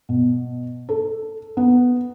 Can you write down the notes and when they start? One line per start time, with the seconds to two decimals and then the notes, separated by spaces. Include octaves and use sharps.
0.09 B2
0.89 A4
1.57 B3